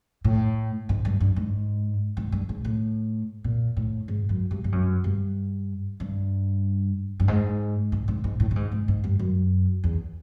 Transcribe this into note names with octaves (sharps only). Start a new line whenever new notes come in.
A2
G#2
G2
G2
G#2
G#2
G2
G#2
A2
A#2
A2
G#2
F#2
G2
G2
F#2
G2
G2
G2
G#2
G#2
G#2
G#2
A2
A2
G#2
G#2
G#2
G2
F#2
E2